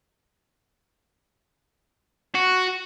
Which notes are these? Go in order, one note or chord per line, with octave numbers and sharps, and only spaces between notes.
F#4